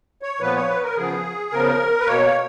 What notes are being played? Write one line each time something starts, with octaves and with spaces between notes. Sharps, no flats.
C#5
A#2 F3 B3 B4
C#5
B4
A#4
C#3 F3 B3 G#4
C#3 F3 B3 A#4
B4
B2 A#3 C#5